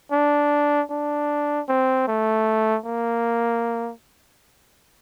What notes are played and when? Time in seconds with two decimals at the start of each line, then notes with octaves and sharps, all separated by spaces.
0.12 D4
0.90 D4
1.68 C4
2.08 A3
2.86 A#3